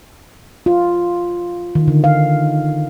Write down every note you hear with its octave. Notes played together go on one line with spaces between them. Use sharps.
F4
D#3
D3
F5